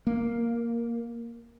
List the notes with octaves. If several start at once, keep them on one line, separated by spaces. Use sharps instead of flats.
A#3